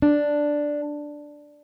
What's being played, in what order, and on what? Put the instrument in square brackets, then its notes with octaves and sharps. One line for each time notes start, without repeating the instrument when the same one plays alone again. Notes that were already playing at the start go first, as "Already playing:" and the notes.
[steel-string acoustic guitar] D4